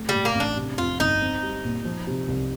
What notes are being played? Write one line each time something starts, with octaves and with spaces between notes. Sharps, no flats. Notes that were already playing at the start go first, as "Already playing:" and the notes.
Already playing: A3
G3
A2
A#3
A1
D4
C3
F2 F4
G1 D#4
C4
G3
A#2
F3
C3
C2